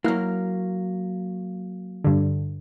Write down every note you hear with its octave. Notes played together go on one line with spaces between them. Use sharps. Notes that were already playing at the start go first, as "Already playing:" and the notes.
F#3 A#3 E4 F6
G2 D3